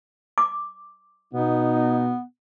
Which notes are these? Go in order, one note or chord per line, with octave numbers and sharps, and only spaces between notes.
D6
B2 B3 D#4